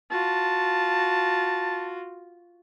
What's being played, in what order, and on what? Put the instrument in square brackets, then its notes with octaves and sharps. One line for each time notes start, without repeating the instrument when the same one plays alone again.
[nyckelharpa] F4 F#4 [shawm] A5